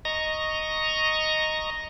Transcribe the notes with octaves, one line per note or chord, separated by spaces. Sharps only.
D#5 A#5 C#6